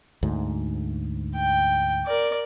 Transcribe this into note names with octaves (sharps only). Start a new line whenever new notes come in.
D2 G#2
G5
A#4 D5